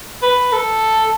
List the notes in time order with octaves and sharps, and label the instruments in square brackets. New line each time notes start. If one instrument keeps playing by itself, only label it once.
[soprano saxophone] B4
A4